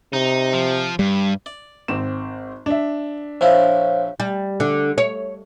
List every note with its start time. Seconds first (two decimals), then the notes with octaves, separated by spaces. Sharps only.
0.13 C3 D#4
0.53 F3
0.99 G2 G3
1.46 D5
1.88 G#1 C4 E7
2.66 D4 E5
3.41 A#1 F3 E4 C5 C#5 F5
4.20 G3
4.60 D3
4.98 C#5